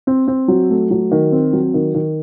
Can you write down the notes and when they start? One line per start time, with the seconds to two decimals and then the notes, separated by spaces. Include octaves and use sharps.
0.07 C4
0.28 C4
0.48 F#3
0.70 A3
0.91 F#3
1.11 D#3
1.32 C4
1.53 F#3
1.74 D#3
1.94 D#3